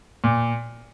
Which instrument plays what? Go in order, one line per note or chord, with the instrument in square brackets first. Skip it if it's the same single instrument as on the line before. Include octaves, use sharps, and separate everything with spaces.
[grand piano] A#2